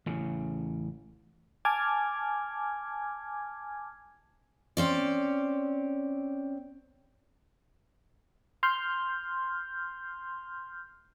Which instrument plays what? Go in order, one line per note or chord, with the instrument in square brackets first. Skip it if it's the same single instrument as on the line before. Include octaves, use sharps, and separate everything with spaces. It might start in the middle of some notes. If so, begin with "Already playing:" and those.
[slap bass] A1 C#3
[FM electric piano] G#5 A5 D6 F6 G#6
[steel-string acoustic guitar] C4 C#4 D5
[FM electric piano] C6 F6 G6